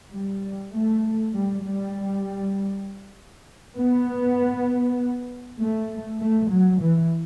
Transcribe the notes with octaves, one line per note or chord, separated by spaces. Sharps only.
G3
A3
G3
G3
B3
A3
A3
F#3
E3